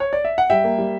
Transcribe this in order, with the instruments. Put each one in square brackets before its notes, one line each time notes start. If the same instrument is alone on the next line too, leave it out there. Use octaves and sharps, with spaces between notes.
[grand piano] C#5
D5
E5
F#5
G3 E5 G5
A#3
G3